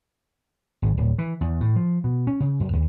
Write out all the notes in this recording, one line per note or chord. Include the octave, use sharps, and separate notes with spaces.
G#1
D1
E3
E2
A2
F3
B2
C#4
C#3
F#2
D#2